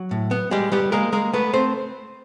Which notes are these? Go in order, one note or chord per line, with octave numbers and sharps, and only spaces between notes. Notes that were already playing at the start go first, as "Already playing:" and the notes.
Already playing: F#3 F#4
A2
B3
G3 G#3 G4
G3 B3 G4
G#3 A#3 A#4
G#3 A#3 A#4
A3 B3 B4
A3 C4 C5